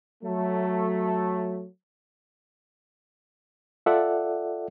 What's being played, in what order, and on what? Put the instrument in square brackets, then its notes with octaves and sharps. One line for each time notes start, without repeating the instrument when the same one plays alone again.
[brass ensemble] F#3 A3
[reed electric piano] F4 A4 D5 E5 F#5